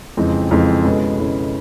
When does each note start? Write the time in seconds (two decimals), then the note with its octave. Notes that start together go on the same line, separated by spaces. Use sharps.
0.17 F2 C#3 E3 G#3 C4
0.51 F2 C#3 E3 G#3 C4
0.85 B2 G#3 C#4 E4 A4
1.17 B2 G#3 C#4 E4 A4